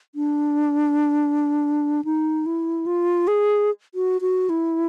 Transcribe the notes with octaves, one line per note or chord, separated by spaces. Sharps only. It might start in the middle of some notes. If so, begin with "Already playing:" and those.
D4
D#4
E4
F4
G#4
F#4
F#4
E4